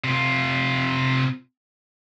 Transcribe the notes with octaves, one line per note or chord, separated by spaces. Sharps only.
C3 F4